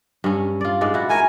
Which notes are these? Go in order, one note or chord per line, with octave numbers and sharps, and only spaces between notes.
G2 C#4
F4 D5
G#2 G#3 D5
E4 F#4
A3 A#4 G#5